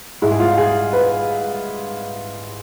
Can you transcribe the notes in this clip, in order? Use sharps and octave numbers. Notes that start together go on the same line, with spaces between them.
G#2 G#3 E4
G#4
F4
G#4
B4